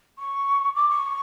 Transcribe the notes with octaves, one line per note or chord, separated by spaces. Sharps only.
C#6
D6
C#6